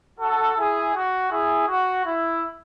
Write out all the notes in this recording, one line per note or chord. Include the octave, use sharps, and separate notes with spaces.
F#4 A4
E4 G#4
F#4
E4 G#4
F#4
E4